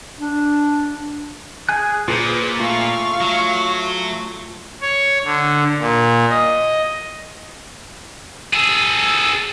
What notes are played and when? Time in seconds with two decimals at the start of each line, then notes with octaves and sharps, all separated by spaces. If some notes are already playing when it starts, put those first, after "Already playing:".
0.19 D4
1.69 G#4 G#5 F#6
2.08 A#2 F4 G#4 B4 C5
2.60 A3 F4 F5 C#6
3.21 F#3
4.82 C#5
5.25 D3
5.80 A#2
6.30 D#5
8.53 G#4 A4